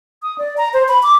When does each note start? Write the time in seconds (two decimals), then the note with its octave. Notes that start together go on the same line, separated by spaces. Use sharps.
0.22 D#6
0.38 D5
0.58 A#5
0.74 C5
0.89 B5
1.03 D6